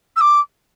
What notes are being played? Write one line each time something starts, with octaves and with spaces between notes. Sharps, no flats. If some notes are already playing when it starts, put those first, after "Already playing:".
E6
D6